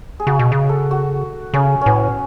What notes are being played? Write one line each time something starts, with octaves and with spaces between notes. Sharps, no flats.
G#4
C#3 F#4
B2
C#3
A4
F#4
C#3 C#4
A2 B3 C#4